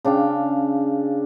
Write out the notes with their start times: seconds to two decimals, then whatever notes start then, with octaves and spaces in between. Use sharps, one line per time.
0.05 C#3 D4 F5 G5